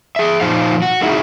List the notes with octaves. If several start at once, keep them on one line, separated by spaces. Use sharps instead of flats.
G#4 E5
A#2 F3 D#4 C5 F5
F#4
G#3 A#3 D#4 E4 F#4 G#4